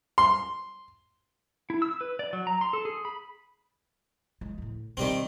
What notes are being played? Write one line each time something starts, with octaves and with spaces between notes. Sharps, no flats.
C6
E4
E6
B4
D5
F#3
A#5
C6
A4
G#4
B5
G#3
D2 A2
B2 D#3 G3 C4